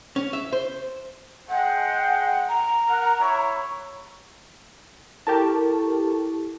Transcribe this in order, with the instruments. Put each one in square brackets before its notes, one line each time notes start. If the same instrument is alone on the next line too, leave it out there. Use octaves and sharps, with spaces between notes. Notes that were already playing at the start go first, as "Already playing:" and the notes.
[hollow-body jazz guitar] C#4
E5
C5
[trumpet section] G#3 G5 [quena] F#5
[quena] A#5
[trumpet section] A#4 F#5
E4 C#5
[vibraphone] E4 A4 C#6 [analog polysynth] G4 A#4 A5